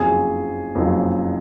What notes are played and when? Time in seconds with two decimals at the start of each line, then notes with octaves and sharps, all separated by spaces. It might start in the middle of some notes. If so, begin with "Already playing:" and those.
Already playing: F#1 F2 C#3 F#3 C4 G#4 G#5
0.75 F#1 F2 C#3 F#3 C4